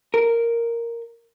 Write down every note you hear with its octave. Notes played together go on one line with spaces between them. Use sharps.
A#4